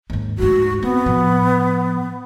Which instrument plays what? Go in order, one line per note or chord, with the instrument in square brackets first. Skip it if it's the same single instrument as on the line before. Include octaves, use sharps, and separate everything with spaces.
[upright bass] D#2 G#2
[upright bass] D2 G#2 [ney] F#4
[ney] B3 [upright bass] C4
[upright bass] A2 F3